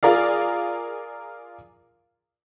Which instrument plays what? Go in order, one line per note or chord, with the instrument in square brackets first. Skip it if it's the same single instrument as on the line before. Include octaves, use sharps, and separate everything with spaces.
[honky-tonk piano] F4 G#4 A#4 D5 F5